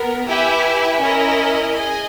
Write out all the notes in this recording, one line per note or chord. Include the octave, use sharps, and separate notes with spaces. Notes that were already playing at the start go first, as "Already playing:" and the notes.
Already playing: B3 A#4
E4 G4 B4 E5 G#5
C#4 E4 A#4 D#5
G#4 D#5 G#5